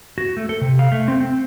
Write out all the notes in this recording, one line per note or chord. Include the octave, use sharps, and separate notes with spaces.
F#4
A3
A4
C3
F5
A3
C4
C4